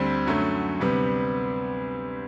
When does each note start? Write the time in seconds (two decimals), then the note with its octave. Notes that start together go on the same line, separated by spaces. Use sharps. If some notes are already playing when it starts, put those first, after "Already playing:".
Already playing: D2 D3 G3 C4
0.27 F#2 D3 F#3 A3
0.80 D2 C3 G3 B3